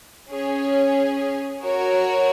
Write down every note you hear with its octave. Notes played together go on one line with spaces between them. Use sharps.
C#4 G#4 C#5
F#4 A#4 C#5